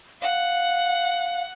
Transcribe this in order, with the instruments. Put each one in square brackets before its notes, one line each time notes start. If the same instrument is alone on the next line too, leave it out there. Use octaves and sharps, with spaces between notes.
[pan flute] F5 [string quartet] F#5